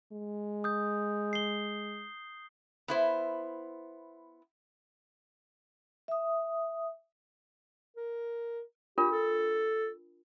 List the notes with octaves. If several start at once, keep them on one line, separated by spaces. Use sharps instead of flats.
G#3
D#6 G6
C7 G7
B3 E4 C5
E5 D#6
A#4
D4 F4 G4 A#4
A4